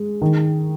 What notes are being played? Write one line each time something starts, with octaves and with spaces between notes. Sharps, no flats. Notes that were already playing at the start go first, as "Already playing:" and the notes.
Already playing: G#3
D#3